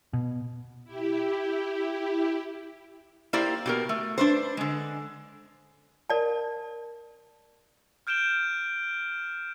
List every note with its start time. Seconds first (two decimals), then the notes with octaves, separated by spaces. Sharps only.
0.13 B2
0.84 E4 G4
3.33 A#3 E4 G4 C5 D5
3.66 B2 G4 A#4
3.89 A3
4.18 D4 B4 C5
4.57 D3 G#3
6.10 A#4 D5 A5
8.07 F6 G6 D7 E7 G7